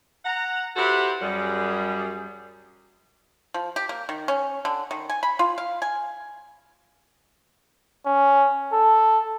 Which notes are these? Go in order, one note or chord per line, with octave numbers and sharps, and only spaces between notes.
F#5 A#5
E4 F#4 G4 A4 B4 C5
F#2 G3 G#4
F3
G4
A#3
D#3
C#4
D3
D#3
G#5
B5
F4
F5
G#5
C#4
A4